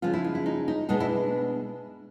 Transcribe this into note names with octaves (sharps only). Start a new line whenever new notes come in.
C#3 F3 G#3 C#4 F4
E4
D#4
E4
D#4
D#4
B2 G#3 B3 D4 D#4
E4